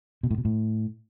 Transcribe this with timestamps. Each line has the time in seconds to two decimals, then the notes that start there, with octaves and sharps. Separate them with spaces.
0.23 B2
0.31 A2
0.38 B2
0.45 A2